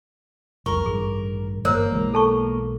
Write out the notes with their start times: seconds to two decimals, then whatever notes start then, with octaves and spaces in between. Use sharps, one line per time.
0.66 F1 C2 A#4 C#6
0.86 A1 G2 D#3 G#4
1.65 G1 A#3 A#4 C5 C#5
1.92 B1 E3 G#3
2.14 A4 A5 C#6